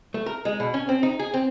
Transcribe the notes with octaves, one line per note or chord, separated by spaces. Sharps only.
A3
A#4
G#3
B2
C#4
C4
D#4
G#4
C4